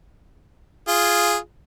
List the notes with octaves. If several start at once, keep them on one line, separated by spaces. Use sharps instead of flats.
F4 G#4